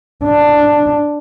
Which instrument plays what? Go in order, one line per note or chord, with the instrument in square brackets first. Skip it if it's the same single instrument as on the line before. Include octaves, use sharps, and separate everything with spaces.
[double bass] D4